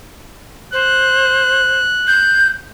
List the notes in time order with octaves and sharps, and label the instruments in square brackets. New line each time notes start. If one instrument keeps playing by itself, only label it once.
[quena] C5 [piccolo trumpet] F#6
[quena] G6